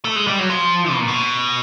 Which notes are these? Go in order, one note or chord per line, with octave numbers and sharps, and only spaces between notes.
A3
G#3
G3
F#3
F3
B2
A#2
B2